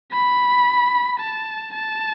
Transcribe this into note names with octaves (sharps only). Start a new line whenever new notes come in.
B5
A5
A5